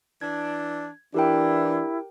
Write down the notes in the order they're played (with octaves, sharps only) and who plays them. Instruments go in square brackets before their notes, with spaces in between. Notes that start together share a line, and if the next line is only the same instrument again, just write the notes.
[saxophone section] E3 D4 [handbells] G#6
[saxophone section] E3 [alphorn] D4 [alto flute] E4 [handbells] G4 A#4 G5